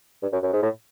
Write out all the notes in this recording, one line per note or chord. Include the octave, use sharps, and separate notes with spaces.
G2
F#2
F#2
G#2
A2